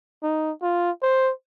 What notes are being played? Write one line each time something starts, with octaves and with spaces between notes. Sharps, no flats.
D#4
F4
C5